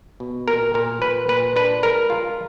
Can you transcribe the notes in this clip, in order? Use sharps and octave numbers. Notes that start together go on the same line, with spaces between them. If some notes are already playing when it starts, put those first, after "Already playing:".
B2
A#2 A#4
A#2 A#4
A#2 B4
A#2 B4
D4 B4
G#3 A#4
F4